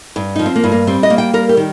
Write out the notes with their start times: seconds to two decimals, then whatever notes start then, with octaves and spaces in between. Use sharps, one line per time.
0.16 G2
0.36 F3 D#4
0.46 C4
0.56 A#3
0.64 G2
0.72 A#3
0.87 G3 C4
1.03 D#5
1.10 A#3
1.18 G5
1.33 G3 A#4
1.49 G4
1.57 D#3